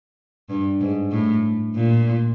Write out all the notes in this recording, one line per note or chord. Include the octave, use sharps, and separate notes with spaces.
G2
G#2
A2
A#2